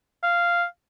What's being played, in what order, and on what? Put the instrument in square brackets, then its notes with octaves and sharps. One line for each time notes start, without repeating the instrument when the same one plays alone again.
[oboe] F5